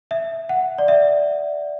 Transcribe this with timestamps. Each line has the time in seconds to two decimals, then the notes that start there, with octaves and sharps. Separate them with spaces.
0.11 E5
0.49 F#5
0.78 D5
0.88 E5